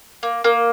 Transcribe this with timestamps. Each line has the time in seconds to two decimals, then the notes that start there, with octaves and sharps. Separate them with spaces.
0.23 A#3
0.44 A#3